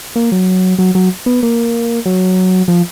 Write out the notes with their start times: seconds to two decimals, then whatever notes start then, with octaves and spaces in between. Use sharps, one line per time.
0.16 A#3
0.32 F#3
0.79 F#3
0.95 F#3
1.26 B3
1.43 A#3
2.06 F#3
2.68 F3